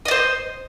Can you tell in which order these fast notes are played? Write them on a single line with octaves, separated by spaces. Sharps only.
D#5 D5 C5